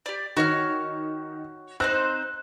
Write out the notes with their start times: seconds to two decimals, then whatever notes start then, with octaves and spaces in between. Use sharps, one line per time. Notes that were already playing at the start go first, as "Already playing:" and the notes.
0.06 G4 D5
0.37 D#3 F#4 C#5 F6
1.80 C4 D#4 C5 F#6